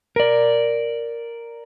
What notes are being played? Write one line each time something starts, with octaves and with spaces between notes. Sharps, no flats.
A#4 D5